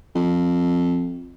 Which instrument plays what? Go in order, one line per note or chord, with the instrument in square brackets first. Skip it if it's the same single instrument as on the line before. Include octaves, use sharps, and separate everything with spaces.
[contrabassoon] F2